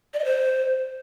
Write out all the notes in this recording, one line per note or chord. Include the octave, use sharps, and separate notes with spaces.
D5
D#5
C5